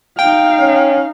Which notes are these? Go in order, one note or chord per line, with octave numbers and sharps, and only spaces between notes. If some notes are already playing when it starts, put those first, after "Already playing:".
D#4 F5 G5
C#4